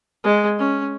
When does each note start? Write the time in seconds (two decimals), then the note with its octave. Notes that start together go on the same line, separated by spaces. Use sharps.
0.24 G#3
0.59 C#4